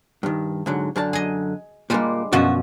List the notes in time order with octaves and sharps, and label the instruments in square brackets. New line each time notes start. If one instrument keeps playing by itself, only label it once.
[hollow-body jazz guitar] G2 D#3
G#2 D3 F#3
F#2 D3 A5
[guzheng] G#4 D#5
[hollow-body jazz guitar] A#2 A#3 [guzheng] G3 G#3 D4
[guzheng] F#2 B2 F3 [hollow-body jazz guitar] F#4